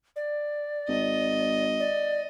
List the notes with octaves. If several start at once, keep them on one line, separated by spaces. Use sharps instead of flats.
D5
G#1 D#5
D5